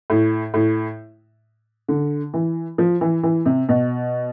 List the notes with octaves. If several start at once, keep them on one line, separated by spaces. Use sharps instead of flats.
A2
A2
D3
E3
F3
E3
E3
C3
B2